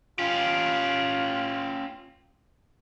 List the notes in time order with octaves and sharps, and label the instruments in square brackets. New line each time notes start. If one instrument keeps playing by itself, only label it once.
[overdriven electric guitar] C#4 G4 [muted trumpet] F4